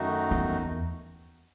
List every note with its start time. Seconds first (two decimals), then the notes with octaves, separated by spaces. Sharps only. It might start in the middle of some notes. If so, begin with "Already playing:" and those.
Already playing: F#2 D#3 A3 D#4 F#4
0.31 E2